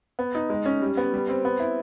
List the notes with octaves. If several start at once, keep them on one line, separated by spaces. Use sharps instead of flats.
B3
D#4
G#3
C#4
G3
B3
G3
C4
B3
E4